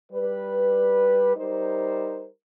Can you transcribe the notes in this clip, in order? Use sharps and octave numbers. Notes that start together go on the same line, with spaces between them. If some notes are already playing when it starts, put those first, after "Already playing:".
G3 B4
G3 D#4 A#4 C5